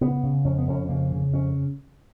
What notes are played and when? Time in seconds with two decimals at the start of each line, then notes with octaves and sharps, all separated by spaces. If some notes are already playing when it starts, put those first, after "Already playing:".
0.01 C#3 B3
0.23 C#3
0.45 F2 C#4
0.58 B3
0.67 F2 C#4
0.89 C#3 A#3
1.12 C#3
1.33 F2 C#4